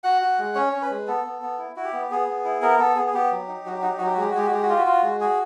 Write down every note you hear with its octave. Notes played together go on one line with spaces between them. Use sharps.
F#4 F#5
F#4
G#3
C#4 C#5
C#4
B4
G#3
B3 A4
B3
B3
E4
E4 F#4
G4
B3
B3 G#4
B3
E4
B3 A#4
B3 A4
B3 G#4
G#4
B3 G4
F#3
D#4
F#3 F#4
G4
D#4 F#4
G4
F#3 F#4
G4
F#4
G#3 G4
F#4
G#3 G4
F#4
G#3 G4
F#4
F4 G4
F#4
F4
G#3
F#4 G#4